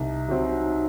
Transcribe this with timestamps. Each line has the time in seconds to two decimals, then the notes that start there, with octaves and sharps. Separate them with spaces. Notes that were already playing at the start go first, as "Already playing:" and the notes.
Already playing: C2 D#4
0.28 C3 F#3 C4